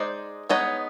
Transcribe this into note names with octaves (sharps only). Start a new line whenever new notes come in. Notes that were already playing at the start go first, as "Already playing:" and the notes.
Already playing: G#3 D#4 C5 D5
G#3 B3 D#4 C#5 D#5